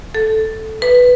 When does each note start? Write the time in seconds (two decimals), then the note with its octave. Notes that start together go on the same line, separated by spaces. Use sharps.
0.15 A4
0.82 B4